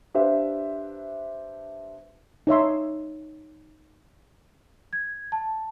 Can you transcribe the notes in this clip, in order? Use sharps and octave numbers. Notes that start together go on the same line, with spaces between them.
D4 G4 B4 C5 E5 F5
D#4 C#5 E5 C6
G#6
A5